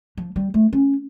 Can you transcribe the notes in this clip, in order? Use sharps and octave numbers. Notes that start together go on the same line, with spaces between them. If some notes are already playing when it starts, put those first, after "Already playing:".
F3
G3
A3
C#4